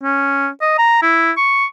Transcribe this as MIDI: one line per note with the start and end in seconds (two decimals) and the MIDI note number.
0.03 0.49 61
0.61 0.75 75
0.79 0.99 82
1.02 1.32 64
1.37 1.65 85